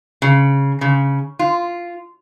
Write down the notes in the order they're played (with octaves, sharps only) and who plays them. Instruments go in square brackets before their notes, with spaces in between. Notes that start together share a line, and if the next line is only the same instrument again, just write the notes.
[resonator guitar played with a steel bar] C#3
C#3
F4